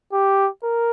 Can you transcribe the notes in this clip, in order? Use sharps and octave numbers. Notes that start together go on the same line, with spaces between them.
G4
A#4